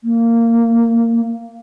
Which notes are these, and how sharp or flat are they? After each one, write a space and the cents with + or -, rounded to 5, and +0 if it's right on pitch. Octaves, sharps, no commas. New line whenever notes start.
A#3 -15